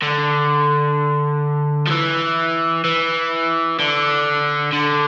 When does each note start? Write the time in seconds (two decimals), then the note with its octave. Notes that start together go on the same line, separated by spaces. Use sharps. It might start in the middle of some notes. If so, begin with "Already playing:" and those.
0.02 D3
1.87 F3
1.91 E3
2.85 E3
3.79 D3
4.73 D3